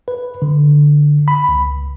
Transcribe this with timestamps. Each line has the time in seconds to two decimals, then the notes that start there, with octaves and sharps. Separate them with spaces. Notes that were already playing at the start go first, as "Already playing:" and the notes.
0.08 B4
0.42 D3
1.28 B5
1.49 C#2